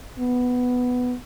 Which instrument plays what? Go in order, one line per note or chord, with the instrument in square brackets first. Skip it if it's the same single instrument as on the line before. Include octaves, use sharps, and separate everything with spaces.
[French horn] B3